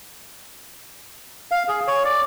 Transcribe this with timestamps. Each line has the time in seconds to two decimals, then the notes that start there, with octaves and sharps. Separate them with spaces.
1.51 F5
1.68 G#4
1.88 C#5
2.05 D5